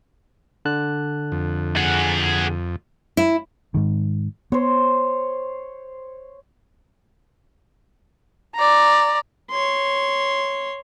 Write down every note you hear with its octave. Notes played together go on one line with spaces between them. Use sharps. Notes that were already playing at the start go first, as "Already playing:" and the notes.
D3 A5 F#6
F2
G#4 F#5
E4
G#2 D#3
B3 C5 C#5
D5 A#5
C#5 C6